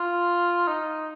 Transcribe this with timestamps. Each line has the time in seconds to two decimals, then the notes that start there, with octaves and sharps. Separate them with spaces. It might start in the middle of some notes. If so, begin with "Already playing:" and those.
Already playing: F4
0.68 D#4